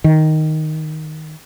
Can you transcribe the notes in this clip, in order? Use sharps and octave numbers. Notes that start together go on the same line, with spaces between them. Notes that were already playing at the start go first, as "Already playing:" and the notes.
D#3